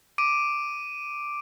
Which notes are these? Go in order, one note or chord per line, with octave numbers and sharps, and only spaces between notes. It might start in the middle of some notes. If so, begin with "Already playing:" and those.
D6 D7 D#7